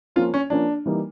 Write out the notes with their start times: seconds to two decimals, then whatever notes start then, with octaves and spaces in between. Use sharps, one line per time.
0.16 F3 A#3 C#4 F4
0.34 C#4
0.50 F3 A#3 C#4 D4
0.86 E3 G3 A#3 D#4